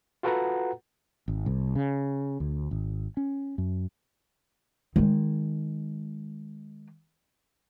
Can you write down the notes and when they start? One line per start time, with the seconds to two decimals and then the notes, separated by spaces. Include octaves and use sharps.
0.23 F4 F#4 A4 B4 F#5 A#5
1.28 G#1
1.46 C2
1.75 C#3
2.40 D2
2.71 G#1
3.17 C#4
3.58 F#2
4.96 D#3 G#3